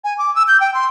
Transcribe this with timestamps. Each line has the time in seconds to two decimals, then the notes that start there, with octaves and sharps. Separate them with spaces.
0.04 G#5
0.18 D6
0.35 E6
0.48 G6
0.60 G5
0.74 C6